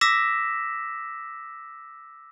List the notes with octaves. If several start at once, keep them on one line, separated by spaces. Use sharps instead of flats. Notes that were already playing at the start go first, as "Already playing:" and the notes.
D6 E6 A#6 B6 E7